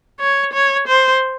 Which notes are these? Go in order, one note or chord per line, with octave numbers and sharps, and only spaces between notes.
C#5
C#5
C5